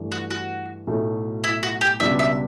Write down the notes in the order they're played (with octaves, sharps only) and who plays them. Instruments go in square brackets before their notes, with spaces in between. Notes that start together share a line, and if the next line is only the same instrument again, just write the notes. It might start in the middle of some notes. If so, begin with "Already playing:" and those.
Already playing: [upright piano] G2 E3 A3
[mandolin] F#4
F#4
[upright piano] B1 A2 F#3 A3
[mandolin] E4
F#4
G4
[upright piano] C#2 B2 G3 D4 [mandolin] E5
[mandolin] E5